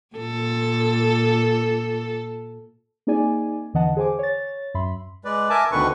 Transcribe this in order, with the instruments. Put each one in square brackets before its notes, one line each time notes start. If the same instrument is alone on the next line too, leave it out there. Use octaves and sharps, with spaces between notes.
[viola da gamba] A#2 A4
[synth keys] A#3 C4 D#4 G#4 D5 G#5
E2 D3 E3 D#5 F#5 A5
G#4 C5 G#5 D6
C#5 A6
F#2 E5 B5 C6
[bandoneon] G#3 B4 D5
A#4 E5 G#5 A5 D6
D2 B2 D3 D#3 B4 C#6